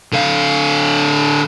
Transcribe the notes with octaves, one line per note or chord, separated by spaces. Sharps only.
D3 F5